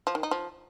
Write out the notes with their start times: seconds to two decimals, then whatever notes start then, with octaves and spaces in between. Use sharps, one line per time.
0.07 F3
0.15 D#3
0.23 D#4
0.31 F3